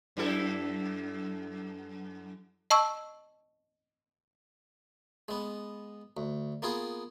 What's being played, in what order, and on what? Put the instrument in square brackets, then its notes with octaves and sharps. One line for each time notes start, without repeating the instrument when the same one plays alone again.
[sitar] F#2 E4 A4
[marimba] D#5 A5 C#6 E6
[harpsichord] G#3 B3
D2
A#3 B3 F4 G#4